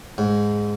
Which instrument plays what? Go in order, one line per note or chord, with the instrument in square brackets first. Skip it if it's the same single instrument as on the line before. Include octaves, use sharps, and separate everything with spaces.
[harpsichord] G#2